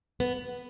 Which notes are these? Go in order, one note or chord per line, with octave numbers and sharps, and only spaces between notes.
B3